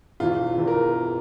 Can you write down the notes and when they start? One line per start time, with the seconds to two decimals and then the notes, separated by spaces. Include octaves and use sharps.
0.20 E1 E2 E3 F4
0.58 E2 E3
0.68 A#4